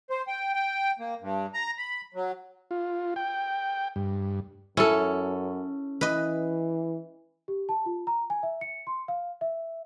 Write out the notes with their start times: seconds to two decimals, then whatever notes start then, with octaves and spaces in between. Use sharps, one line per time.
0.10 C5
0.27 G5
0.54 G5
0.99 A#3
1.22 G2
1.54 A#5
1.78 B5
2.14 F#3
2.71 F4
3.16 G5
3.96 G2
4.77 F#2 C#4 E4 A4
6.01 E3 B4 D#5
7.48 G4
7.69 A5
7.86 F4
8.07 A#5
8.30 G#5
8.43 E5
8.61 C#7
8.87 C6
9.08 F5
9.41 E5